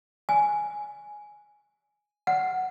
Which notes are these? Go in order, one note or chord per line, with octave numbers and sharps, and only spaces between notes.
G#5
F#5